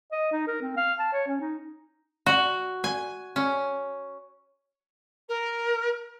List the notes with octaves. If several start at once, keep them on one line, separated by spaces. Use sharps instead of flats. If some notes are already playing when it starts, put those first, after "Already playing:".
D#5
D#4
A#4
C4
F5
A5
C#5
C#4
D#4
F#4
G#5
C#4
A#4